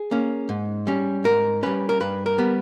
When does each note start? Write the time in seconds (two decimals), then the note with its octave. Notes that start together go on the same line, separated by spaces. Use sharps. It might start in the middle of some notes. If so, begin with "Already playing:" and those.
Already playing: G#4
0.11 A#3 C#4
0.49 G#2
0.87 G3 C#4
1.24 G#2 A#4
1.63 G3 C#4 B4
1.89 A#4
2.00 G2 B4
2.26 A#4
2.38 G3 B3